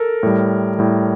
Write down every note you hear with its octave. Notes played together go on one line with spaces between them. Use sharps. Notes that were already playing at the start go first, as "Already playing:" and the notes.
Already playing: A4 A#4
A2 G3
A2 G3